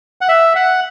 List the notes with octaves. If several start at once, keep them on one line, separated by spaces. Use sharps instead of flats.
F#5
E5
F#5